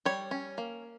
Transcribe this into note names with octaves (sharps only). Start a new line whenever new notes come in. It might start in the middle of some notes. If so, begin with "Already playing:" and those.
G3 C#5
C#4
A#3